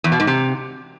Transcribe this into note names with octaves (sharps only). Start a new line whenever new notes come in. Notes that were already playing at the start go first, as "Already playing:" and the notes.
E2
B2
G#2
C3